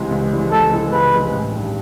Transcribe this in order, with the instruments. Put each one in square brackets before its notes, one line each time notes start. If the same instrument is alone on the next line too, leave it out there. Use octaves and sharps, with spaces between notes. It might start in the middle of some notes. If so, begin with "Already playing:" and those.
Already playing: [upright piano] C#2 C3 E3 G#3
C#2
C3 E3 G#3
[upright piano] C#2 [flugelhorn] A4
[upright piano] C3 E3 G#3
[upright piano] C#2 [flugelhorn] B4
[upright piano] C3 E3 G#3
A1
G2 D#3